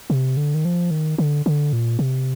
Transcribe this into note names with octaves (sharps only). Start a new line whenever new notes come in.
C3
D3
D#3
F3
D#3
D3
D3
A#2
C3